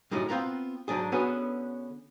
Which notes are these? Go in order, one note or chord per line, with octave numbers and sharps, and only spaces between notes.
F#2 A2 C#3 G3 G#3 D#4
B3 C4 F4 B4 A#5
G#2 D3 F#3 D4 G#4
D3 B3 C#4 F#4 G#4 B4